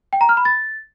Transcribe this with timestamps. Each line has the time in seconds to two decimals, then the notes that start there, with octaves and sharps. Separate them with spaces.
0.13 G5
0.21 A#5
0.29 F6
0.37 B5
0.45 A6